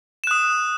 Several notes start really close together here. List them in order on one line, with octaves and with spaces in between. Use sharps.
E7 F#6 D#6